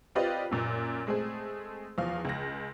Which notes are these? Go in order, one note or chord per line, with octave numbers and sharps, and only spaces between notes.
C4 F4 G4 B4 D5 D#5
F#2 A#2
G#3 A3 C4 G#4
E2 F3 F5
C#2 A#6